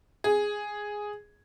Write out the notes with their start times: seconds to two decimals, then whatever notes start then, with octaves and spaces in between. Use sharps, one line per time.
0.24 G#4